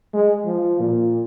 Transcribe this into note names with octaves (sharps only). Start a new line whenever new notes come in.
G#3
F3
A#2